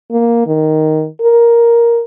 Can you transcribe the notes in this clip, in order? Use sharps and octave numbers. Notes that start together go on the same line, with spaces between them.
A#3
D#3
A#4